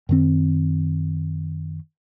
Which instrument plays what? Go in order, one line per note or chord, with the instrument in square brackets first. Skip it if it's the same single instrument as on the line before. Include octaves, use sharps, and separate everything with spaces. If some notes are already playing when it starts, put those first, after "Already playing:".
[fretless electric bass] F#2 D#3 C4